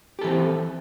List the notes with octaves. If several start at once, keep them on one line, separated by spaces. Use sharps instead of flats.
E3 C4 G4 A4